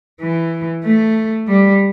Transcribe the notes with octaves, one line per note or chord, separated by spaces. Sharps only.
E3
A3
G3